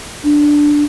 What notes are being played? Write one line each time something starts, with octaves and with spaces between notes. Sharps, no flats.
D4